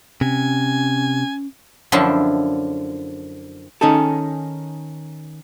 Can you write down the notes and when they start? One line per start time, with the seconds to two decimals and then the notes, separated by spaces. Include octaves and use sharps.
0.21 C3 C#4 G#5
1.92 F#2 D3 F3 E4 G5 A5
3.81 D#3 C#4 D#4 G#4 A4